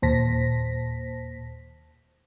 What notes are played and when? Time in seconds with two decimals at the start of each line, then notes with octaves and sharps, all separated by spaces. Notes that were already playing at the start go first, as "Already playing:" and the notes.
0.02 D#2 A#2 C5 A5 A#6 B6